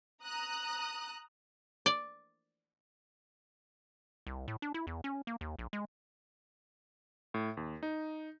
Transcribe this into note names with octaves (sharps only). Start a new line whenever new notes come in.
A#5 D#6 F#6
D5
C2
A2
D4
E4
E2
C#4
A#3
D#2
A#1
G#3
A2
D#2
D#4